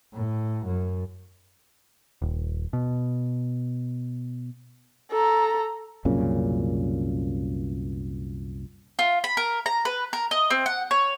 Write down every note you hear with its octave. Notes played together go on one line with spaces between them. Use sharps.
A2
F#2
D#1
B2
A4 A#5
C2 F#2 A#2 C#3
F4
B5
A#4
A#5
B4
A#4
D#5
C4
F#5
C#5